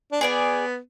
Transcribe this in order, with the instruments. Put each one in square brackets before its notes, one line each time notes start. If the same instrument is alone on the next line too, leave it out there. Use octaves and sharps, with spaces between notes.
[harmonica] D4
[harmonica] B3 [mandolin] G#4 D5 G#5